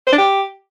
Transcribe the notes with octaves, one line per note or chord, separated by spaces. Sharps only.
C5
D4
G4